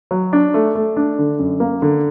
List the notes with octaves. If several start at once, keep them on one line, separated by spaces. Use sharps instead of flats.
F#3
D4
A3
A3
D4
D3
F#2
A#3
D3